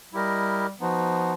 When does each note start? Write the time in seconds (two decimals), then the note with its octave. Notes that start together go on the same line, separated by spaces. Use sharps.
0.13 G3 E4 G4 A#4 D#5
0.80 F3 B3 D#4 F#4